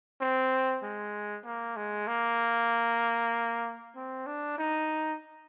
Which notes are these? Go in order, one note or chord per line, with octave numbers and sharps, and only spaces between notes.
C4
G#3
A#3
G#3
A#3
C4
D4
D#4